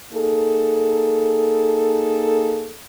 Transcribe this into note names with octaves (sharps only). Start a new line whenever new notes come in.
A#3 D#4 G#4 A4